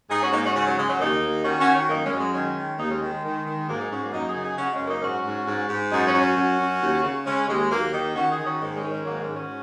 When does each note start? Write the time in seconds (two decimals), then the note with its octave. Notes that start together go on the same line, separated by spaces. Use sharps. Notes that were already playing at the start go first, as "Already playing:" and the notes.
0.10 G#2 D#4 G#4
0.22 C#4 F#4
0.33 G#2 A#3 D#4
0.44 C#4 F#4
0.55 C#3 C#4 F#4
0.66 F#3
0.78 C#3 G#3
0.89 F#3
1.00 D#2 A#3 D#4
1.22 D#2
1.45 D#3 C#4 F#4
1.60 C#4 F#4
1.67 D#3
1.74 C#4 F#4
1.89 F#2 A#3 D#4
2.04 G#3 C#4
2.12 F#2
2.20 G#3
2.34 D#3 G#3 C#4
2.56 D#3
2.79 D#2 A#3 D#4
2.90 G#3 C#4
3.01 D#3 G#3
3.12 G#3
3.24 D#3
3.46 D#3
3.68 G#2 F#3 A#3
3.80 D#4 G#4
3.91 G#2 C#4 F#4
4.02 F#3 A#3
4.13 F#2 A#3 D#4
4.28 D#4 G#4
4.36 C#3
4.43 D#4 G#4
4.58 C#3 C#4 F#4
4.73 G#3 C#4
4.81 F#2
4.88 A#3 D#4
5.02 G#2 C#4 F#4
5.25 G#2
5.48 G#2
5.69 G#2
5.92 F#2 D#4 G#4
6.07 C#4 F#4
6.14 F#2
6.22 C#4 F#4
6.37 F#2
6.59 F#2
6.82 D#2
7.04 C#3
7.26 C#3 G#3 C#4
7.48 D#2 G#3
7.71 D#2 F#3 A#3
7.93 D#3 A#3 D#4
8.16 D#3 C#4 F#4
8.31 D#4 G#4
8.39 D#3
8.45 C#4 F#4
8.60 G#2 A#3 D#4
8.75 G#3 C#4
8.83 D#3
8.90 G#3 C#4
9.05 G#2 F#3 A#3
9.20 G#3 C#4
9.27 G#2
9.35 C#4 F#4